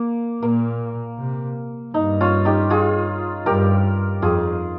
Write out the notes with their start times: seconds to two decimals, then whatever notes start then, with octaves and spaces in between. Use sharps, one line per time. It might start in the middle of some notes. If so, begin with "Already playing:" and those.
Already playing: A#3
0.43 A#2 A#3
1.19 C3
1.94 G2 D#4
2.21 C#4 F4
2.45 D#4 G4
2.70 F4 G#4
3.46 G2 G4 A#4
4.22 F2 F4 G#4